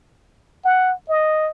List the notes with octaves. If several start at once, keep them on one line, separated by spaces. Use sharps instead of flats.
F#5
D#5